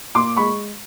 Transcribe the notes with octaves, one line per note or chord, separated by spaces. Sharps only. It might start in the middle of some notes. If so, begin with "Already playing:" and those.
A#2 C6 D6
G#3 B5 C#6